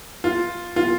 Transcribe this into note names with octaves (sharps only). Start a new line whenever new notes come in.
F4
F4